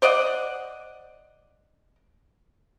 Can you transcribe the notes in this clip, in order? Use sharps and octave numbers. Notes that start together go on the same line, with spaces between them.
C5 D5 D#5 F#5